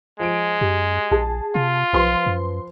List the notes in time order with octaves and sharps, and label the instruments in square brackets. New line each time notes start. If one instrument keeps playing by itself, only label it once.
[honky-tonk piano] F3 D7 [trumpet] G#3
[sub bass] F#2 [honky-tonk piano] G4
[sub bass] A#1 [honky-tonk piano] G#4 A5
[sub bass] C3 [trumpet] F4
[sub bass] B1 [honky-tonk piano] F3 B4 C6
[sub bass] F#2